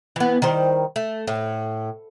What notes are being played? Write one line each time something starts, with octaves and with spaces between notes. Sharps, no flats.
E3 B3
D#3 G3 C5
A3
A2